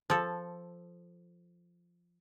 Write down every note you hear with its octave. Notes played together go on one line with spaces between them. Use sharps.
F3 A4